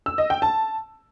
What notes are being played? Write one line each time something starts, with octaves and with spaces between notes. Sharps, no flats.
E6
D#5
G5
A5